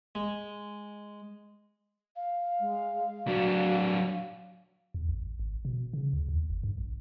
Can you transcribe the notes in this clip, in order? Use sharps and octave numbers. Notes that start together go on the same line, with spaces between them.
G#3
F5
G#3
F#3 D4 F#4
E2
A1
G#1
B2
C#3
D2
D#2
G1
G2
A#1